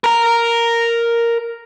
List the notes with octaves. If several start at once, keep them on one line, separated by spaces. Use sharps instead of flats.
A#4 A#5